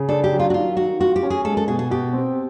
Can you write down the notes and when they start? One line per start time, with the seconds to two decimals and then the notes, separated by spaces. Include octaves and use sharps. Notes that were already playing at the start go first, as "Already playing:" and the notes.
Already playing: C#3
0.09 D4 A4
0.24 G4
0.32 F#3
0.39 F4
0.50 F#4
0.54 D#3 F4
0.77 D#3 F#4
1.00 F4 F#4
1.16 G4
1.23 C#4
1.30 G#4
1.45 G#3 A4
1.57 A4
1.68 B2 G#4
1.79 G#4
1.91 B2 G4
2.13 C4